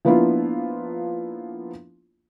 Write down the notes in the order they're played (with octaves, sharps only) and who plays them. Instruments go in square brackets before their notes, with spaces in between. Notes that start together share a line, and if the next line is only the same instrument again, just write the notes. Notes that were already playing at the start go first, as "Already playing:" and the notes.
[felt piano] F3 A#3 B3 D4 E4 F4